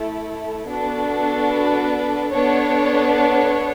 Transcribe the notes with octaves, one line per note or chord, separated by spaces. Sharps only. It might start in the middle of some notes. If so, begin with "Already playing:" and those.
Already playing: A3 E4 A4
B3 D4 F#4 A4
B4
B3 D4 A4 C#5
C#5